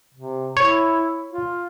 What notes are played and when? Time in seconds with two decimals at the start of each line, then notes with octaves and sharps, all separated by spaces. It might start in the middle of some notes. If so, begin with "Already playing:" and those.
0.14 C3
0.57 E4 C#5
1.33 F4